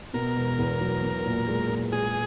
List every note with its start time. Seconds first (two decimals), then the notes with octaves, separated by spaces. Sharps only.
0.13 B2 A#4
0.36 E1
0.58 E2
0.81 F#3
1.03 B3
1.25 A#2
1.48 G#3
1.70 A#2
1.92 G#3 G#4